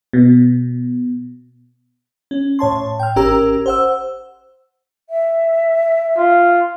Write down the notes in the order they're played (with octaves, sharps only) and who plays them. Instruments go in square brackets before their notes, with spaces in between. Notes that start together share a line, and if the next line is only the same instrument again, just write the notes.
[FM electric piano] B2
C#4
A2 C#5 A5 C6
G5 F6
G#1 C#4 G4 A#4 A#5 E6
C5 F#5 E6
[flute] E5
[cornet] F4